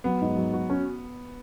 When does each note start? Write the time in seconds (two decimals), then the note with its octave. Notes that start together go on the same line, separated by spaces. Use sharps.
0.04 F#3 B3
0.21 G#2
0.37 F#3
0.53 F#4
0.70 C#4